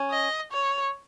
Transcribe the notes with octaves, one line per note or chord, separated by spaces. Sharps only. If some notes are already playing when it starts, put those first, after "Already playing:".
Already playing: C#4
D#5
C#5